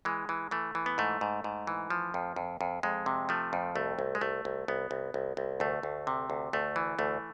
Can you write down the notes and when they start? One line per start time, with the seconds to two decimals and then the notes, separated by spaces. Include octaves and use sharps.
0.05 E3 G#3
0.29 E3
0.51 E3 A3
0.75 E3
0.86 B3
0.98 G#2 A3
1.21 G#2
1.44 G#2
1.67 E3
1.90 F3
2.14 F2
2.36 F2
2.61 F2
2.83 F2 G#3
3.06 C3
3.29 F3 A3
3.53 F2
3.75 C2 A3
3.99 C2
4.15 G#3
4.21 C2 A3
4.45 C2
4.68 C2 B3
4.91 C2
5.14 C2
5.37 C2
5.60 D2 A3
5.83 D2
6.07 C3
6.30 D2
6.53 D2 A3
6.76 E3
6.99 D2 A3